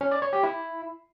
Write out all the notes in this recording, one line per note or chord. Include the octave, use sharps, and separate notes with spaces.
C#4
D5
C#5
G4
E4